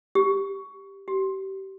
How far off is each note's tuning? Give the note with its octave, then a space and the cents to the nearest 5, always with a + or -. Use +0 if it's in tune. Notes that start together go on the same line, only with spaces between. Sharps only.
G4 +5
G4 -30